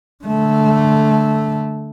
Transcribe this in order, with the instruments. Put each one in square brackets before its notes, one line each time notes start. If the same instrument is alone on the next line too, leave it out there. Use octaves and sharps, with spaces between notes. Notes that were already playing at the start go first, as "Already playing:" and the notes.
[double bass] D3 A3